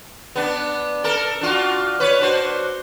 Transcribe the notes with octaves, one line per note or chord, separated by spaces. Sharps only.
B3 D4
A4 A#4
D4 F4 F#4
B4 C#5
D4 F#4 C5